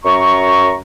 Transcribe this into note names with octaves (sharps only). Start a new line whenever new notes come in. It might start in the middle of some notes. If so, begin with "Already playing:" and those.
F#2 A#5 C#6